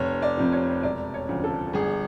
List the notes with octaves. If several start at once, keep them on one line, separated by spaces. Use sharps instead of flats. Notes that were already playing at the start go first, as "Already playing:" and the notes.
Already playing: F1 C#5
D5
F2 C3 F3
C#5
E1 D5
C#5
D2 C#3 F3
A4
G1 G#4